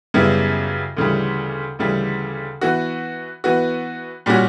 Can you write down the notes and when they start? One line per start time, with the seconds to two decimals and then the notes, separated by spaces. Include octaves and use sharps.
0.14 F#2 C#3 G3 B3 E4
0.97 D2 C#3 E3 G3
1.79 D2 C#3 E3 G3
2.61 E3 B3 F#4
3.44 E3 B3 F#4
4.26 A#2 G3 C#4 F#4